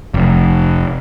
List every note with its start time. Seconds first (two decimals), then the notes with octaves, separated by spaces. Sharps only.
0.14 F1